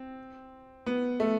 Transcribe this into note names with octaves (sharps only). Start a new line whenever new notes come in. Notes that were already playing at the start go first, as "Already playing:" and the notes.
Already playing: C4
B3
A3